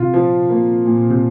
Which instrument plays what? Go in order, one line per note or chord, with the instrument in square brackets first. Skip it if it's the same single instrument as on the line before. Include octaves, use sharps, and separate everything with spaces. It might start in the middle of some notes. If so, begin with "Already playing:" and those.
Already playing: [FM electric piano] C3 [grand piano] F4
[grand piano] F3
A#3
A#2
[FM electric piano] C3